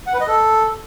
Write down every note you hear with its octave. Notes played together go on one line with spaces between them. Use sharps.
F#5
B4
D#5
A4